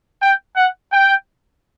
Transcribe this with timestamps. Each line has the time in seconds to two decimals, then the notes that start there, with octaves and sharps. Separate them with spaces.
0.21 G5
0.56 F#5
0.91 G5